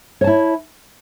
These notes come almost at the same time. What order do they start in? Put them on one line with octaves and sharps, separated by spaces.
C#5 A5 E4